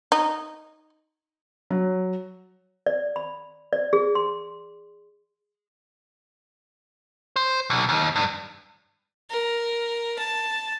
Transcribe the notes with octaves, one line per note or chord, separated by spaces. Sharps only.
D#4
F#3
D5
B5
D5
G#4
C6
C5
B1
D#2
G2
A#4
A5